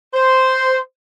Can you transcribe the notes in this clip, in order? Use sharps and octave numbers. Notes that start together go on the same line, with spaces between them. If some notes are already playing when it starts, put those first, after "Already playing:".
C5